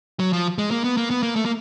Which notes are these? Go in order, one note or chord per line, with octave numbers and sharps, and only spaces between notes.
F#3
F3
G#3
A#3
B3
A#3
B3
A#3
A3
A#3